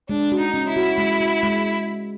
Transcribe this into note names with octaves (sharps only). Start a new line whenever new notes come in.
G#3 D4
F#4
D#4
C#4
E4
F#4
G#3
F#4
G#3